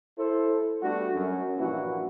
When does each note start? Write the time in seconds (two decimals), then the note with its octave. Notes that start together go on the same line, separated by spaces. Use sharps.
0.18 E4 A4 C5
0.82 G3 A3 B3 D4 F#4
1.15 F#2
1.58 A#1 G2 E3 A#3 E4 F#4